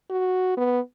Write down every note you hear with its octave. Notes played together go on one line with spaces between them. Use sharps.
F#4
B3